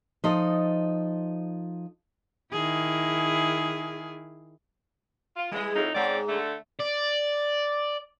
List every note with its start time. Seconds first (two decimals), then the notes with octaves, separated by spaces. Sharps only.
0.24 F3 D#4 A4 C5 D#5
2.53 D#3 E4 G#4
5.36 F4
5.52 E3 G3 G#3 G#4 D#5
5.75 F2 A2 D#4
5.95 G#2 G#3 C4 C#4 D5
6.28 D3 A3
6.80 D5